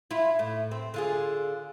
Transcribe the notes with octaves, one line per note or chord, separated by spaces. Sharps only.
E4 F4
A2
C4
D3 F4 G#4